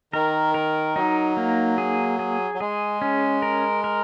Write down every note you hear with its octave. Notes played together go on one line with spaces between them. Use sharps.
D#3 A#4
A#4
F#3 D#4
A#3
G#4
G#4
F#3
G#3 G#4
C#4
A#4
A#4